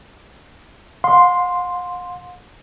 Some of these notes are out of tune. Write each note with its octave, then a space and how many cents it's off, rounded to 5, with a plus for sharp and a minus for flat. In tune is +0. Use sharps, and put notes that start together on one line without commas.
F5 +45 C6 +0